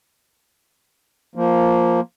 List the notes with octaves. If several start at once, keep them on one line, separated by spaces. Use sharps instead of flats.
F3 A#3